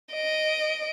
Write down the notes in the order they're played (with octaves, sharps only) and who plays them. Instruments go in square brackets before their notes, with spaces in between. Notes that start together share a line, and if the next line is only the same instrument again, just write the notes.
[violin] D#5 D7